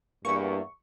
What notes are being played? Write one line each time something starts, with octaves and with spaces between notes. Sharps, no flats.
E2 G2 A#3 E4 C#6